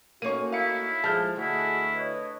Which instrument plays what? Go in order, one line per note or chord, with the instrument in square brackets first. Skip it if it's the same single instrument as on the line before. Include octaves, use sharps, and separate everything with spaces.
[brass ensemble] A3 D#4 F#4 [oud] A#3 C#4 [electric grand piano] C#6 D#7
[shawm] E4 [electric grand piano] F5 C#7
[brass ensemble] F3 [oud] G#3 [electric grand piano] A5 F6 G6
[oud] D2 [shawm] E4 [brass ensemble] F#4 G#4 D#5
[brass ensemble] B4 C#5 D#5